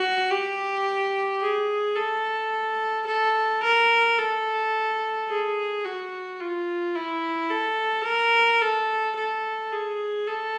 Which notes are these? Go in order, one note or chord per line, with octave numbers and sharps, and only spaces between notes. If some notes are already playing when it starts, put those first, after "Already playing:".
Already playing: F#4
G4
G#4
A4
A4
A#4
A4
G#4
F#4
F4
E4
A4
A#4
A4
A4
G#4
A4